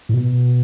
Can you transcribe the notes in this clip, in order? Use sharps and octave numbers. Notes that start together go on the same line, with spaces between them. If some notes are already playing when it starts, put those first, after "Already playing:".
A2
B2